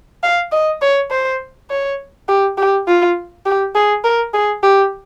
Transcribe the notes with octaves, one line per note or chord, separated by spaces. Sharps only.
F5
D#5
C#5
C5
C#5
G4
G4
F4
G4
G#4
A#4
G#4
G4